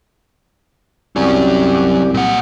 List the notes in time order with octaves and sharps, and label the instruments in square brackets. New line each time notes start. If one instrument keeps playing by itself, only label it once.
[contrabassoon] C2 [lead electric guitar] F#3 C#4 [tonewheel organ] G4 D5
[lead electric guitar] A#2 F#5